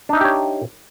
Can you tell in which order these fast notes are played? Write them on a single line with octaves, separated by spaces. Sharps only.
D4 D#4 E5 G4 C#5